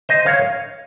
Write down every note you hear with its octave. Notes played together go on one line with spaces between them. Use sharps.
C5 D#5
C#5 F5